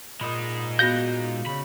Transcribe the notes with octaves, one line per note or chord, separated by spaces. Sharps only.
A#2 G#3 D#4 B5 D#6
B3 F#4 F5 G6 A#6
C#3 B5